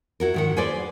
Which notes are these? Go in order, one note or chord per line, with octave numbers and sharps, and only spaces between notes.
E4 F#4 A#4
G#2 D#3 F#5
G#4 B4 C5 D5